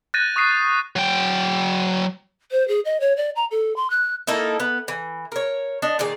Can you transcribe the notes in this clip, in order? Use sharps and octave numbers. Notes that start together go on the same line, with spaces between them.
F#6 G6 A6 A#6 D#7
C#6 D#6 A#6 C7 D#7
F#3 G5
C5
G#4
D#5
C#5
D5
A#5
A4
C6
F#6
A#3 D#4 E4 A4
B3
E3
A#4 C#5
D4 C#5 D#5
A#2 D#3 G#4 D5